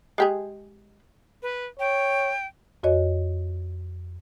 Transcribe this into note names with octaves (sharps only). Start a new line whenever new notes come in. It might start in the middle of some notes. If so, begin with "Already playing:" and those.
G#3 G4 G#4
B4
C#5 G5
F2 F#4 C#5 D#5